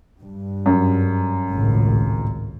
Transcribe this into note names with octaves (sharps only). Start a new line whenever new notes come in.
G2
F#2
G#1 C#2 A2